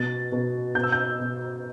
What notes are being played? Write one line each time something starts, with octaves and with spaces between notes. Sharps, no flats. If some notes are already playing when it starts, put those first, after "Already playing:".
Already playing: B2 A6
B2
B2 G6
E6
G6
B2